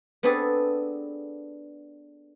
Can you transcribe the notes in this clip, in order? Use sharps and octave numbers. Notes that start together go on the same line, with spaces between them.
B3 C4 D4 G#4 A4 B4